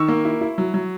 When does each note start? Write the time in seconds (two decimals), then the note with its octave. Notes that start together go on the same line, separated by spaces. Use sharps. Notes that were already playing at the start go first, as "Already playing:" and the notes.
Already playing: D#3 C#6 E6
0.08 A#3
0.25 E4
0.41 E4
0.58 F#3
0.74 F#3